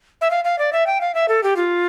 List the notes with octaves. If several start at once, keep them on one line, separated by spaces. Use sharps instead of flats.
E5
F5
F5
D5
E5
G5
F5
E5
A4
G4
F4